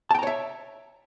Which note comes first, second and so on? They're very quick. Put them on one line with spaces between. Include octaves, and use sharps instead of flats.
A5 G5 A#5 C#5 E5